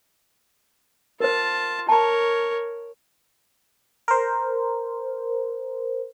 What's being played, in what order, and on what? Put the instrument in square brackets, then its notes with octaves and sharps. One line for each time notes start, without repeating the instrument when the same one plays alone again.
[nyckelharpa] F4 A5 [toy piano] A#4 C5
[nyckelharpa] A#4 C#5 [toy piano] A5 A#5
[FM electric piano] A#4 C5